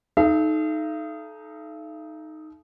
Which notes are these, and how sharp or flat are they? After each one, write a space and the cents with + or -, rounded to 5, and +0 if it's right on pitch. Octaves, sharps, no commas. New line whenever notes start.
D#4 +0 A4 -30 F5 -45